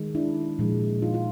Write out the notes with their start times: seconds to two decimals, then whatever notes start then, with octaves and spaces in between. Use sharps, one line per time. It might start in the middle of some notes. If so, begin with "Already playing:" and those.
Already playing: D#3 G#3
0.15 D4 E4
0.59 A#2 F3 G#3
1.02 D#4 F4
1.14 F4